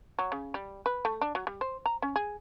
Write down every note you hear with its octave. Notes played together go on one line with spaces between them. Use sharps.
F#3
C#3
G3
B4
A3
D4
F#3
G3
C5
A#5
C#4
G#4